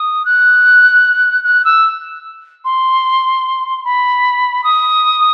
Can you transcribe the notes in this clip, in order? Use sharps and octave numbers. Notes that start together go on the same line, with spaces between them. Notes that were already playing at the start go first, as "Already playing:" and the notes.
Already playing: D#6
F#6
F#6
E6
C6
B5
D#6